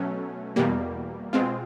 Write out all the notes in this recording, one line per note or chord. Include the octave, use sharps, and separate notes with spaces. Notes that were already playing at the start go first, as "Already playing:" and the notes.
Already playing: B2 F#3 A3 C#4
E2 B2 G3 A#3
B2 G#3 C4 F4